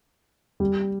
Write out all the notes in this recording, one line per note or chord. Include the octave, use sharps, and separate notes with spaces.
G3